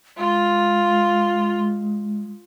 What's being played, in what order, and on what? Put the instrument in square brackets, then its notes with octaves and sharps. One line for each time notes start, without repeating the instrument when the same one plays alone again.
[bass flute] G#3 [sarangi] F4